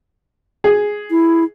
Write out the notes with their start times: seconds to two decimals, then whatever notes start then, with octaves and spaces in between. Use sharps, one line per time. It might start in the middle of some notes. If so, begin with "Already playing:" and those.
0.64 G#4
1.11 E4